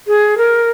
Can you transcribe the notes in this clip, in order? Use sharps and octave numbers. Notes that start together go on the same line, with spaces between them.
G#4
A#4